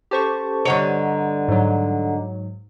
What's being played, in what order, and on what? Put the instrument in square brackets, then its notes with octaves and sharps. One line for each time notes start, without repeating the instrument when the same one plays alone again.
[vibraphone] C#4 A4 A5 [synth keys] G4 C5 C#6
[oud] G2 D3 C#5 [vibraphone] D#5 F#5 A#5
[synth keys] G#2 F#3